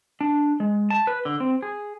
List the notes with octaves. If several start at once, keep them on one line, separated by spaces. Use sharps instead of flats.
D4
G#3
A5
B4
D3
C4
G#4